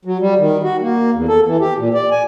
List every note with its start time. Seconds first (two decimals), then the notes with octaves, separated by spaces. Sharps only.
0.05 F#3
0.20 G3
0.38 D#3
0.63 F#4
0.82 A#3
1.14 E2
1.28 A4
1.46 E3
1.60 G4
1.78 A#2
1.94 D5
2.11 G#5